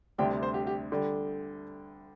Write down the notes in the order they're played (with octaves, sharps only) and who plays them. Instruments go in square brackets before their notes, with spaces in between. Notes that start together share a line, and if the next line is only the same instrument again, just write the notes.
[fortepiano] D2 C3 G3 D4 [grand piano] G5
[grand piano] C5
G4
G4
[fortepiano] D3 G3